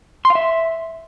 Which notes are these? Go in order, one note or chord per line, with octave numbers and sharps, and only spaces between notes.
C6
F5
E5